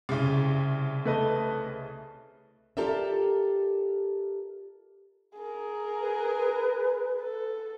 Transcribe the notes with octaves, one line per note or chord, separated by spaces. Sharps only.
C2 C#3
A3 B4 D#5
F4 G4 A4 A#4 D5 E5
G#4 A#4
B4
A4